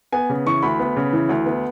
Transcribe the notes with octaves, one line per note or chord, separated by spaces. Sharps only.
B3 G#5
C#3
E3 C#6
D2 B5
B3
C#3
E3
D2
B3